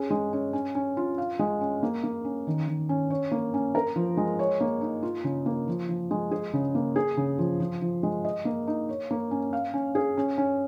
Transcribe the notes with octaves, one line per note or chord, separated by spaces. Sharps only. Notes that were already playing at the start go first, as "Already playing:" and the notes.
Already playing: C#4 G#4
G#3
C#4
C#4
C#4
F4
F5
G#3
C#4
A#3
A#3
C#4
D#3
D#3
C#4
C#5
A#3
C#4
A#4
F3
G#3
C#5
A#3
D#4
F4
C#3
A#3
F3
F3
G#3
G#4
C#3
A#3
G#4
C#3
F3
F3
F3
G#3
D#5
A#3
D#4
C#5
A#3
C#4
F5
C#4
G#4
C#4
C#4